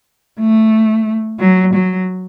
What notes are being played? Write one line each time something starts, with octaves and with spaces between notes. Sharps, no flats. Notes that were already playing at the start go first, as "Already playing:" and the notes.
A3
F#3
F#3